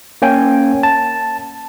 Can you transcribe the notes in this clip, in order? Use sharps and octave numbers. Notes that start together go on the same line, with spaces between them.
A#3 C#4 G5 G#5
A5